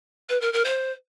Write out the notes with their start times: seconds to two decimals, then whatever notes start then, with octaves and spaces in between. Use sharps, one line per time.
0.29 B4
0.41 A#4
0.53 A#4
0.65 C5